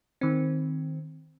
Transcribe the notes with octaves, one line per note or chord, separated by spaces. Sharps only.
D#3 C4